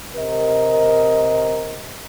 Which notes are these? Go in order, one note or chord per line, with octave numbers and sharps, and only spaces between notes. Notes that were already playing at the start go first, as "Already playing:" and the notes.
C3 A#4 D#5